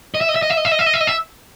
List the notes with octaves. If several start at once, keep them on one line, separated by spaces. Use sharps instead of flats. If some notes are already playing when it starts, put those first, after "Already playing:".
D#5
E5
D#5
E5
D#5
E5
D#5
E5
D#5
E5
D#5
E5
D#5
E5